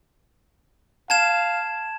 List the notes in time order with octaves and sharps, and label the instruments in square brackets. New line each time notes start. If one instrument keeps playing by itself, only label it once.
[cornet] F5 [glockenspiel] A5 G#6 E7